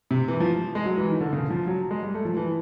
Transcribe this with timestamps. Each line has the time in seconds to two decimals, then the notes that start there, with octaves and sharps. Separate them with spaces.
0.11 C3
0.28 E3
0.40 F3
0.75 G#3
0.86 F#3
0.97 E3
1.09 D#3
1.20 D3
1.33 C#3
1.50 F3
1.67 F#3
1.91 G#3
2.03 G3
2.14 A3
2.25 F3
2.37 E3